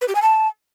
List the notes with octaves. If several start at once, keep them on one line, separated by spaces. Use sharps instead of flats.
B4
G4
G#5
A5